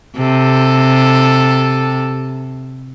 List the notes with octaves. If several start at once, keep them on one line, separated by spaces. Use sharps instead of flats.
C3 A4